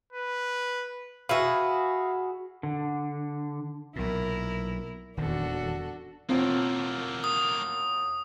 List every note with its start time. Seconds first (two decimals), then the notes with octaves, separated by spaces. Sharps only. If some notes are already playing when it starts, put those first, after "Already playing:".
0.13 B4
1.29 F#4 G#4 B4 E5 F5
2.63 D3
3.96 B1 A#2 E4 A#4
5.17 D#1 E2 D#3 D4 F#4 A4
6.29 E1 A3 A#3 C4 F4
7.24 D#6